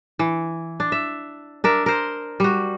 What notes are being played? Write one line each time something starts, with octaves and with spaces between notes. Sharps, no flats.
E3
D4
E5
D4 A#4 E5
A#4 C5
G3 F#4